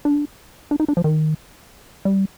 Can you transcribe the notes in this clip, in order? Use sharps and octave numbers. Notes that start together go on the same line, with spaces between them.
D4
D4
D#4
D4
F3
D#3
G3